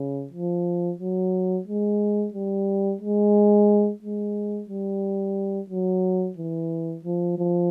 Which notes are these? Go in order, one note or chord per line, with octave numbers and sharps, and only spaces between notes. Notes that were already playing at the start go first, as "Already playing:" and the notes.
Already playing: C#3
F3
F#3
G#3
G3
G#3
G#3
G3
F#3
E3
F3
F3